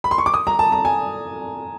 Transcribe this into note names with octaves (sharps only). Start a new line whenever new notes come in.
B5
C6
C#6
D6
D#6
A#5
A5
A#5
G#5